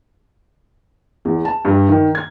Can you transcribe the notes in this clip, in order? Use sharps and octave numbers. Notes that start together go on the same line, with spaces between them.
E2
A5
G2
D#3
G#6